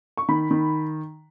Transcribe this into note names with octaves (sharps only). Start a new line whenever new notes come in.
C#6
D#3 B5
D#3